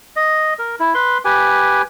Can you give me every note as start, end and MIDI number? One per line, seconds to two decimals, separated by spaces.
0.16 0.54 75
0.59 0.76 70
0.80 0.94 64
0.95 1.18 71
0.95 1.18 84
1.25 1.82 67
1.25 1.82 71
1.25 1.82 80